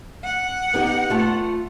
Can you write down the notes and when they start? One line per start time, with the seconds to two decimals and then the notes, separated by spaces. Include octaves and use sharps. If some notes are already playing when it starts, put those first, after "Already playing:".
0.24 F#5
0.74 B3 D#4 G4
1.10 A3 F4 A5